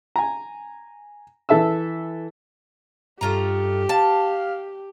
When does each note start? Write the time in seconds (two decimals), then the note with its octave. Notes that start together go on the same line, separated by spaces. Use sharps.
0.16 G#5 A#5
1.49 E3 A4 E5 A5 E6
3.21 G2 A3 F4 G4 A#5
3.89 F5 A5